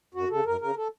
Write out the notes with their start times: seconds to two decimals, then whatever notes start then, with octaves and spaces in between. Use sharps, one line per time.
0.14 F#2 F#4
0.30 C#3 A4
0.46 F#2 A#4
0.61 C#3 A#4
0.77 A4